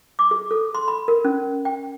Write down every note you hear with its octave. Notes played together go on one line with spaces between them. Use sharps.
D6
G#4
A4
C6
B5
A#4
C#4
G5